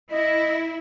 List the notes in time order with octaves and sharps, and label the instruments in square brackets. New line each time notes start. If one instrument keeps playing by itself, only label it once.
[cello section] E4 [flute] D#5